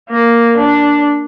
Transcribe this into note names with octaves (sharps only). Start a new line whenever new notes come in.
A#3
D4